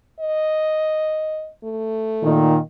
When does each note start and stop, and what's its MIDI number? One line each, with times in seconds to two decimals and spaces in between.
0.20 1.50 75
1.63 2.51 57
2.23 2.58 46
2.23 2.58 51